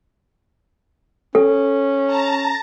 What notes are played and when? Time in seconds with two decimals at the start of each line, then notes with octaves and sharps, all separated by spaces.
1.35 C#4 A4
2.06 A5 A#5